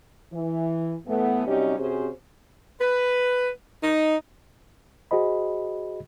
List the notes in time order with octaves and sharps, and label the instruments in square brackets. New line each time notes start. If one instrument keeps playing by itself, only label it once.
[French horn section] E3
A2 E3 A3 B3
C3 F#3 G3 C#4 D#4 G4
C3 C#4 F#4 G#4 C5
[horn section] B4
D#4
[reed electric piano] F#4 G#4 C5 D#5 B5